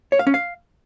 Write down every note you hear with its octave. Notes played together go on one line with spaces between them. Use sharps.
C#5
F5
C#4
F5